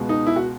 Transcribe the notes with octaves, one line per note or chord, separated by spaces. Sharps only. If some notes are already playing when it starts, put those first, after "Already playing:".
Already playing: C#2 B2 G#3 B3
D#4
E4
F#4